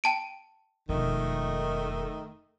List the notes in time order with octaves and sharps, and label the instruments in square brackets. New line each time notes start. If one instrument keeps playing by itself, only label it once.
[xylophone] G5 A5 D7
[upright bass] E1 F2 [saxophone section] D#3 A3